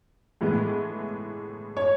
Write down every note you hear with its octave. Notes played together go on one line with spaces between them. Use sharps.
A2 E3 G#3 B3
C#5